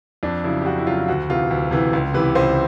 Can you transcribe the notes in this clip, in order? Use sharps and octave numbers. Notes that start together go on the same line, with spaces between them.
F2 D4
C#3 F#3 E4
G4
F2 F#4
E4
C#3 F#3 F4
D2 F#4
C3 E3 F4
D2
C3 E3
C#2
C3 E3 B4
C#2 C5